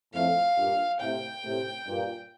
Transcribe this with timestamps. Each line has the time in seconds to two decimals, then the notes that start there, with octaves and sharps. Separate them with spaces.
0.14 F2 A2 F5
0.57 G2 A#2
1.00 A2 C3 G5
1.44 A2 C3
1.87 G2 A#2